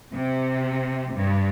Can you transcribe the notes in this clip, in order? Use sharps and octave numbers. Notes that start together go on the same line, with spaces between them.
C3
G2